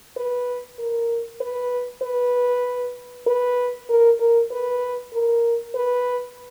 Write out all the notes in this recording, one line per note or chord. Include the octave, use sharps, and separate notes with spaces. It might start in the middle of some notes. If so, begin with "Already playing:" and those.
B4
A#4
B4
B4
B4
A#4
A#4
B4
A#4
B4